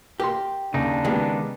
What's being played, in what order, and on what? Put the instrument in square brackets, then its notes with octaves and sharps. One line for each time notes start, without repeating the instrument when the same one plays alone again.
[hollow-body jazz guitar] G4 [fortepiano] A#4 C6
[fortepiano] D#2 [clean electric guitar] C#3 D#4 [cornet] D4
[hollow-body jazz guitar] D#3 G#3 [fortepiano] B3 G4 G#4